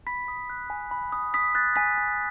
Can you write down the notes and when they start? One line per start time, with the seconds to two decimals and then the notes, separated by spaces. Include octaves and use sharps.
0.07 B5 B6
0.28 D#6
0.50 F#6
0.70 G#5
0.91 B5
1.12 D#6
1.34 D#6 B6
1.55 F#6 A6
1.76 G#5 B6
1.98 G#5